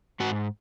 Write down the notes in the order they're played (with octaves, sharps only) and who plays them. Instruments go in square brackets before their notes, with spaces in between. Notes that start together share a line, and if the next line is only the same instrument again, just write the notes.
[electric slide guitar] G#2 F#4